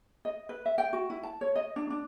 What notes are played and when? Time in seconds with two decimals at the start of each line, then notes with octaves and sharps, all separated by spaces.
0.25 D#5
0.49 B4
0.66 E5
0.78 G5
0.93 F#4
1.10 E4
1.23 A5
1.41 C#5
1.56 D#5
1.76 D4
1.90 D4